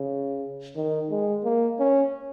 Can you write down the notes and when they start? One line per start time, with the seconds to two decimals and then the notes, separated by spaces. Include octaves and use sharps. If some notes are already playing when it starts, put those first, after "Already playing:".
Already playing: C#3
0.76 D#3
1.10 G#3
1.44 A#3
1.80 C#4